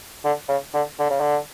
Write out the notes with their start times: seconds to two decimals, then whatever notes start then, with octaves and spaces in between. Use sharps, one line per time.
0.24 D3
0.48 C#3
0.74 D3
0.99 D3
1.10 C#3
1.20 D3